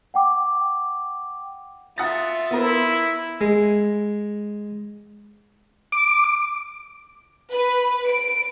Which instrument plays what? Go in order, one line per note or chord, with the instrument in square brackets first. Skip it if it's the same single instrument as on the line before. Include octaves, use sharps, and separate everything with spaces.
[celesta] F#5 G5 D6
[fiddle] F4 E5 [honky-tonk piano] F#5 D#6 A6
[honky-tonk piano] B3 A#4 C5 [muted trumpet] E4
[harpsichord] G#3
[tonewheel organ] D6
[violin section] B4
D7